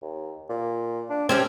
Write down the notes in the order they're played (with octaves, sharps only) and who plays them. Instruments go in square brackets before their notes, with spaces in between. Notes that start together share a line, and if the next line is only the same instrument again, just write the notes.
[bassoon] D#2
A#2
D4
[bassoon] C3 [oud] C4 C#4 G4